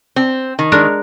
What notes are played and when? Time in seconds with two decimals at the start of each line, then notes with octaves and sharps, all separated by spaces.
0.16 C4
0.59 D#3
0.72 G#3 D4 A#4